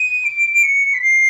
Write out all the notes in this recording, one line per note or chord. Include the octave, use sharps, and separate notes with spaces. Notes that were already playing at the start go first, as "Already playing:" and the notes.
Already playing: D#7
D7
C#7
B6
C7